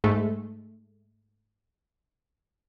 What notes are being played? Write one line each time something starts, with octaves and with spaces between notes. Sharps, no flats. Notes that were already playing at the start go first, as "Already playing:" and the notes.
G#2 G#3 A3